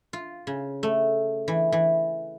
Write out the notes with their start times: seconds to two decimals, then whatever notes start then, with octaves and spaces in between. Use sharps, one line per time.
0.13 F4
0.47 C#3
0.83 A3
1.48 E3
1.72 E3